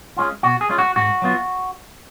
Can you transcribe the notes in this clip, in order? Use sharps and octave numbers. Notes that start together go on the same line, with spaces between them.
G#3 C#4 F4
B2 F#4
G#4
G#3 C#4 F4
F#4
G#2 F#4
F#3 B3 D4 F4